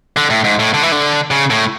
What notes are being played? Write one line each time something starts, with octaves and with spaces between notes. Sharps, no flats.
D3
A2
G#2
A2
D3
E3
D3
C#3
A2